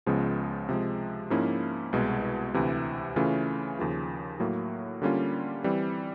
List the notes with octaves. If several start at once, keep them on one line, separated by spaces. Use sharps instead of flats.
C#2 C#3 F3 G#3 B3
C3 F3 G#3
G#2 F3 A#3 C#4 E4
C2 B2 G#3
D2 C3 E3
C#3 E3 A3 C#4 F4
D#2 C#3 F3
A2 F#3 A#3
D3 G3 A#3 C#4 F4
E3 G3 C4